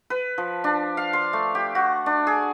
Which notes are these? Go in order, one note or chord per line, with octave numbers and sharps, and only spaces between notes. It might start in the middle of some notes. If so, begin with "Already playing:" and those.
B4
F3
D4
F5
C6
A3
G4
F#4
D4
G#4